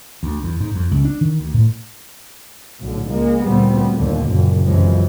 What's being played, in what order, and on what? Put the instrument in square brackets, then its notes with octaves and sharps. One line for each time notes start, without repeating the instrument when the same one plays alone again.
[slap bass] D2
E2
G#2
F2
C#2
D4
D#3
D2
A2
[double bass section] B1 A2 D3
C#2 G#3 A#3
D2 A#2 G3 B3 C4
D#2 A#2 D3
F#1
B1 F#2 C3 E3 F3 G#3